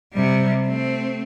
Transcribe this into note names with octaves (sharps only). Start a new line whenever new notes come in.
C3 G3
A3 C4